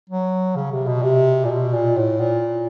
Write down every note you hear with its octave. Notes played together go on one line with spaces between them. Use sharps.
F#3
C#3
C3
B2
C3
A#2
B2
A#2
A2
A#2